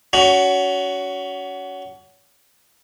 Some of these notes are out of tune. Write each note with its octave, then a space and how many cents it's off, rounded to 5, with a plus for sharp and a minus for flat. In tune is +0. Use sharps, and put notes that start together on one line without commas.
C#4 +30 F#4 +10